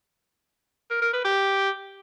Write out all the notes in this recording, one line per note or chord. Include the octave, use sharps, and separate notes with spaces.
A#4
A#4
B4
G4